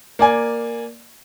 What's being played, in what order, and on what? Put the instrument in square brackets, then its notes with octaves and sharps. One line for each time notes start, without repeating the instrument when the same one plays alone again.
[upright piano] A#3 D5 G#5